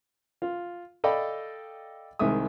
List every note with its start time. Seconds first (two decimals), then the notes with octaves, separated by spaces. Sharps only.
0.42 F4
1.04 A4 D5 D#5 F5 G5 B5
2.19 C2 D#3 G#3 E5 D#6